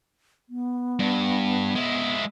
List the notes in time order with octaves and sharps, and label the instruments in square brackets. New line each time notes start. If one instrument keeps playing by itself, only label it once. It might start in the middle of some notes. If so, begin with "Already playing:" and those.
[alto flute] B3
[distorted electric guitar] G2
G#3 E4